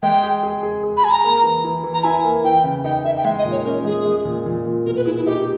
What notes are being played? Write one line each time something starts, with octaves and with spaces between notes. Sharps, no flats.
G#3 G5
G#4
G#4
G#4
G#4
B5
G#4 G#5
A#5
A#3
E3
E3
E3
A#5
E4 G#5
A#3
E3 G5
C#3
D#4 G5
D#4 E5
G5
G#3 E5
D#5
A#2
C#5
C#4 A#4
G#3 G#4
G#3
A#2
A#2
A#2
B2 A#4
B4
E4 G#4
E4
D#4 G4